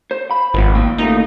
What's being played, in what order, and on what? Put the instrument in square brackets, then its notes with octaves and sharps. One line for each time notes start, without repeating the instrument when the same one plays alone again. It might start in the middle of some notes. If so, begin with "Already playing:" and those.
[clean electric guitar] C5
B5
[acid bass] G#1 [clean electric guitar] D#3 F3 B3
[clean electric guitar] A#3 G5
[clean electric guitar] D#2 A#2 A3 [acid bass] D#4